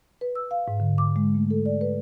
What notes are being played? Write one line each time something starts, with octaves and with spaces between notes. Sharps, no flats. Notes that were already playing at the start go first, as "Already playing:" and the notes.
B4
E6
F5
G#2
D3
D6
G#3
A3
A4
D5
B4